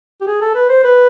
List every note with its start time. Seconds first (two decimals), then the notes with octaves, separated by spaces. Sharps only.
0.21 G4
0.27 G#4
0.41 A4
0.55 B4
0.69 C5
0.83 B4